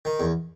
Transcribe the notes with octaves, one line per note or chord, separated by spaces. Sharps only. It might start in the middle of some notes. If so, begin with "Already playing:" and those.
D#3
E2